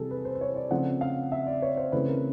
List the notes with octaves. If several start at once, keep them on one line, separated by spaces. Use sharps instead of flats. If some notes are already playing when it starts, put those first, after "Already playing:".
Already playing: C3 E3 G3 G#4 A4
B4
C5
C5
C#5
D5
C#3 F3 A3 C4 F#5
F5
E5
D5
C#5
C5
C#3 E3 A3 C4 B4
A#4